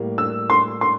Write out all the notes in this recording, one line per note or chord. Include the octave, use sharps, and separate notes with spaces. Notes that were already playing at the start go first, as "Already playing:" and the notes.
Already playing: A2 G3 A#3
E6
C6
C6